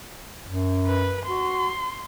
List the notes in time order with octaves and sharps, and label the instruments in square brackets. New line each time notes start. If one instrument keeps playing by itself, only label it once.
[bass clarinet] F#2
[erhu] B4
[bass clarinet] F#4 [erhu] C6